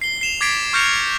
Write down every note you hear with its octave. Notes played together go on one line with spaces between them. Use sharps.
C7 G7
C7 E7 F7
D6 G#6 A6 B6 C7 D7
C#6 F6 G6 A#6 C#7 F7